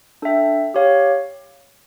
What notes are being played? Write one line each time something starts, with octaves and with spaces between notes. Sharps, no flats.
D4 A4 E5 G5
G4 C#5 F5